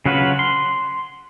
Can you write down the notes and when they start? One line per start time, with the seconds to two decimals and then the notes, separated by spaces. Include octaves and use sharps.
0.06 C#3 F#3 F4 F#4 B4
0.39 C6